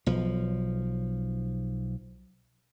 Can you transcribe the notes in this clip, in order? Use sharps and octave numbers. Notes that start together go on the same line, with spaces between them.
B1 F3